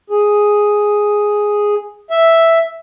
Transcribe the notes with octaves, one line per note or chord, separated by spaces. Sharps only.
G#4
E5